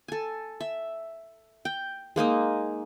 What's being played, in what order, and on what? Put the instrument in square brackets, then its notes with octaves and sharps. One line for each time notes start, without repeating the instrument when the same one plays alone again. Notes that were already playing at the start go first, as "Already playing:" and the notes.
[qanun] A4 G#5
E5
G5
G#3 A#3 D#4 D#5